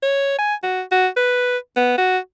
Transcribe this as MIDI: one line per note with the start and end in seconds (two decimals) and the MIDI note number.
0.03 0.34 73
0.39 0.55 80
0.63 0.82 66
0.92 1.08 66
1.17 1.58 71
1.77 1.97 59
1.98 2.18 66